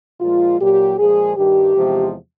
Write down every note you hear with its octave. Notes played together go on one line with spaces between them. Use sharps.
A#2 F3 G#3 F4
A#2 F#3 G4
A#2 F3 G#3 G#4
G2 D#3 G3 G4
E2 C3 F3 G#3